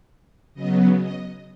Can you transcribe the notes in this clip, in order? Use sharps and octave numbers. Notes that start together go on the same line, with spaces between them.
C#3 F#3 B3 D#5
D#5